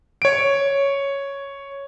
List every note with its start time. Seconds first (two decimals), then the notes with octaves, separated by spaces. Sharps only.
0.22 C#5 D7